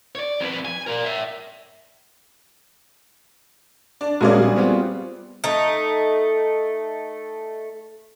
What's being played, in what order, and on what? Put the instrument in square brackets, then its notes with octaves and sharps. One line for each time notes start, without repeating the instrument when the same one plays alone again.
[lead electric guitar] C#5 D5
F2 B4
G#5
A#4 D5
C#5 E5
[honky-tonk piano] D4
[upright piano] A#1 F5 [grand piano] G#3 A#3 C#4 [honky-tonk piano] F#4 G#4 D5
[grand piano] G3
[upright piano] B3 C4 F4
[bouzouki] A3 D#4